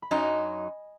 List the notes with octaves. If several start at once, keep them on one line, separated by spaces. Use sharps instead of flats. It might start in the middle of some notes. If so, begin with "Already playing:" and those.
B5
F#2 F#3 D#4 D#5 G#5